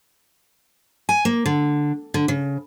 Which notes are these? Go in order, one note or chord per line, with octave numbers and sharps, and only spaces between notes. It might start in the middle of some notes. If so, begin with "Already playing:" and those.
G#5
A#3
D3
D3
C#3